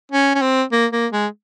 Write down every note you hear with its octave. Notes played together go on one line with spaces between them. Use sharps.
C#4
C#4
C4
A#3
A#3
G#3